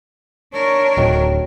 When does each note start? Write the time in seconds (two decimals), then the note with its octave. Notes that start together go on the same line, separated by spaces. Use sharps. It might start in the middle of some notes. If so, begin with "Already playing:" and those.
0.53 D4 A#4 C#5
0.97 D1 D#3 F#3